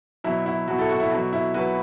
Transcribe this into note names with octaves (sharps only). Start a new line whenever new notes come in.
B2 F#3 E4
E4
B2 F#3 F#4
E4 A4
F#4
E4
B2 F#3 F#4
E4
B2 F#3 F#4 B4